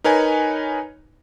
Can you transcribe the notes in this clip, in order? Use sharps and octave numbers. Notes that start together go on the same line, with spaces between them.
D#4 A#4 B4 C#5 G#5